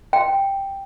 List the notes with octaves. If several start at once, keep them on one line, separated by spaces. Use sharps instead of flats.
G5